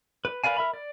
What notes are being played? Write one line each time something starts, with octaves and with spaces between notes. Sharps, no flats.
B4
A#4 B4 D5 F5 G#5
A#4 E5 B5
D5